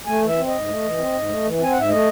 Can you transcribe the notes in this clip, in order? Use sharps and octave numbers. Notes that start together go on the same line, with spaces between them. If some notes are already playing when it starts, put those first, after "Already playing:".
A3 G#5
E3
E5
C4
G#2 D#5
A3
E3
C4
G#2
A3
E3
C4 G#5
G#2 F#5
E5
A3 D#5